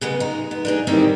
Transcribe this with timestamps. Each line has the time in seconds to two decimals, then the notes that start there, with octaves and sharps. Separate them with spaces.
0.01 C#3 G#3 B3
0.20 D#4
0.51 B3
0.65 D4 D#4 G#4
0.87 D#3 G3 C4 C#4 E4